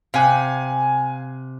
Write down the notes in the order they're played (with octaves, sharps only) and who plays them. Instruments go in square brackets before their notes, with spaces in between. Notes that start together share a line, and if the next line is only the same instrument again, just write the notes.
[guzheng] C3 [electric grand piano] F5 G#5 F#6